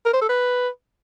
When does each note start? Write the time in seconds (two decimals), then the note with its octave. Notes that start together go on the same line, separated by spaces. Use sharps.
0.06 A#4
0.13 C5
0.21 A4
0.29 B4